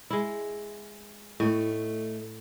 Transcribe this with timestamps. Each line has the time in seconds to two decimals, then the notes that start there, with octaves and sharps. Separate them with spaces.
0.10 G#3 E4
1.40 A2 A3 D#5